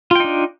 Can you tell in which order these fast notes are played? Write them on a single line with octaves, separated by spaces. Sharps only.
F4 G5 D#4 D4